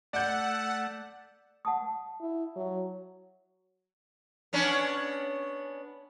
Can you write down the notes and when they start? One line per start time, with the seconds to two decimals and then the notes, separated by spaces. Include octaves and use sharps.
0.13 A3 D5 F#5 E6 G6
1.65 F#5 A5 D#6
2.21 E4
2.56 F#3
4.53 B3 C#4 D4